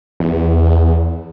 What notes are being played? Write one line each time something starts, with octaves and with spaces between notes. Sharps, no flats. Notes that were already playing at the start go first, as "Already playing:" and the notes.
E2